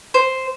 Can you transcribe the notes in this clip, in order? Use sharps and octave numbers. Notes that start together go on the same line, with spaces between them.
C5